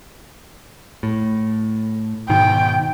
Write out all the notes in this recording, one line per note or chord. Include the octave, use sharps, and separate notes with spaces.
A2
G#2 B2 D#3 G5